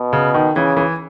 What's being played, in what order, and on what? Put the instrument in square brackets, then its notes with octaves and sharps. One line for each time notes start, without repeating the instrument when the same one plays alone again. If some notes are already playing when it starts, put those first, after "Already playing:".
Already playing: [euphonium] B2
[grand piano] C#3
D#3
[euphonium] C#3 [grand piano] E3
[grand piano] E3